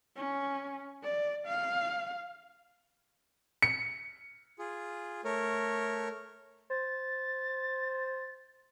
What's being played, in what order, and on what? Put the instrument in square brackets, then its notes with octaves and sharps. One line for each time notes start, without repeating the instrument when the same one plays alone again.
[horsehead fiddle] C#4
D5
F5
[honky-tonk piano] C#7
[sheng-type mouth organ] F4 G#4
A3 A#4 C#5
[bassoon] C5 [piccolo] A6